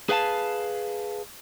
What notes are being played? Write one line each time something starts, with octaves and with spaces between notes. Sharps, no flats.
G#4 B4 F5 G#5 A5